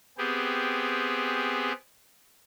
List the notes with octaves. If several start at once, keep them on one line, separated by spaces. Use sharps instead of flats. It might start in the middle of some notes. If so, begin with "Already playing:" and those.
B3 C4 G4 G#4